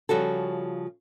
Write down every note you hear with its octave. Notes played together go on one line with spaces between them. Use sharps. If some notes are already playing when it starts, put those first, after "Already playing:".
C#3 F3 G3 F#4 A4